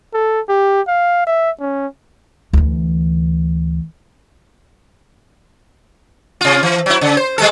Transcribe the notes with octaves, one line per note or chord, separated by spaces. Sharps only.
A4
G4
F5
E5
C#4
D2 E3
C3 F4
E3
F#3 E4
C#3
C5
G3 G#3 A4